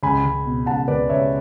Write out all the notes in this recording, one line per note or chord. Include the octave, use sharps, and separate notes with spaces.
C#2 G#5 B5
C#2
B2
C#2 F#5 A5
C#2 B4 D5
C#2 C#5 E5